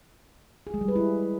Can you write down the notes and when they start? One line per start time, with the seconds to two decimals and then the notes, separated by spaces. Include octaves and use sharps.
0.67 G#4
0.74 G#3
0.81 G3
0.88 B4
0.96 E4